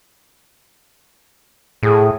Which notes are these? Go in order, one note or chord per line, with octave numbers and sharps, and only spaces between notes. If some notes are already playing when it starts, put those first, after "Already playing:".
A2 G#4